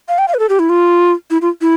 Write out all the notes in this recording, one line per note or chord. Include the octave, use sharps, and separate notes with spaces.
F5
G5
F5
B4
A4
G4
E4
F4
E4
F4
E4